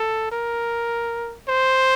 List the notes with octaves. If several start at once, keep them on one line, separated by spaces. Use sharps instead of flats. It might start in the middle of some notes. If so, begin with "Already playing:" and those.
Already playing: A4
A#4
C5